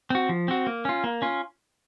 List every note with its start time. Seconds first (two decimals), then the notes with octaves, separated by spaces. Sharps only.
0.10 C4 F#4
0.29 F3
0.48 C4 F#4
0.67 A#3
0.85 C#4 F4
1.04 A#3
1.22 C#4 F4